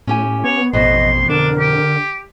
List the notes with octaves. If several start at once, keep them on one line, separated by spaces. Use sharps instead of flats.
A2 C#4 G4 G#5
B3 C#5
A1 F2 B2 E3 D#5 C6
D3 D4 A#4
G4